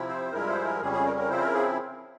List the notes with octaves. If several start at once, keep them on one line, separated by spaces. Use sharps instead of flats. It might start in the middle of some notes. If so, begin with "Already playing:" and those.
Already playing: C3 F3 C4 E4
C5
G2 F3 G#3 E4 A#4
C5
A#4
F2 C#3 G3 C#4 G#4
G#4
A#4
A#4
C#3 F3 C4 E4 C5
A#4
G#4